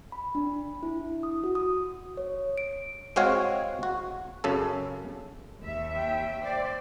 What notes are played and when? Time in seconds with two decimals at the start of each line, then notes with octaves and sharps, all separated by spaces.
0.12 B5
0.35 D4
0.83 E4
1.23 D#6
1.44 F#4
1.55 D#6
2.17 C#5
2.58 D7
3.16 G#3 C4 F#4 C#5 F5 G#5
3.83 F#4
4.44 F#2 C#3 A4
5.61 D#2 E5
5.96 G5
6.44 C5 D5